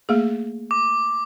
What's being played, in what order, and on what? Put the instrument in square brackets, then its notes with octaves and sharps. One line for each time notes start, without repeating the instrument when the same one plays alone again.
[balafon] A3 A#3 G#4
[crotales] D6